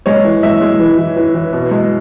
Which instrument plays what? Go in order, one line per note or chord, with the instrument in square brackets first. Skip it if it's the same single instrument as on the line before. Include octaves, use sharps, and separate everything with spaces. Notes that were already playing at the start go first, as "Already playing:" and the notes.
[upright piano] G#3 C#5
E3
G#3 E5
G#3
E3
E3
E3
E3
B2
G#3